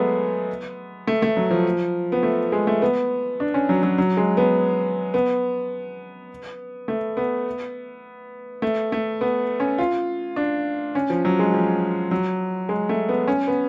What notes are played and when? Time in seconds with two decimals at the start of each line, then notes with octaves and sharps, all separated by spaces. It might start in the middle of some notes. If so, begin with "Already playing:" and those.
Already playing: F#3 G#3 A3 B3
1.07 A3
1.22 A3
1.37 F#3
1.51 F3
2.12 B3
2.23 A3
2.52 G#3
2.67 A3
2.82 B3
3.40 D4
3.54 C#4
3.69 F#3
3.83 F#3
3.98 F#3
4.17 G#3
4.37 B3
5.14 B3
6.88 A3
7.17 B3
8.62 A3
8.92 A3
9.21 B3
9.60 C#4
9.78 F4
10.36 D4
10.95 C#4
11.10 F3
11.25 F#3
11.39 G#3
11.54 F3
12.11 F#3
12.69 G#3
12.89 A3
13.09 B3
13.27 C#4
13.47 B3